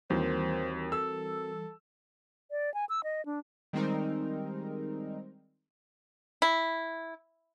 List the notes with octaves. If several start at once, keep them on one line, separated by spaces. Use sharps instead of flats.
D#2 E3 G3 C4 F#4 A#4 C5
A4 E6
D5
G#5
E6
D#5
D4
D#3 G3 G#3 C4 D#4 A#4
E4